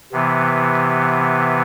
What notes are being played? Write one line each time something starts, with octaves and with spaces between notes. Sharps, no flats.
C3 E3 B3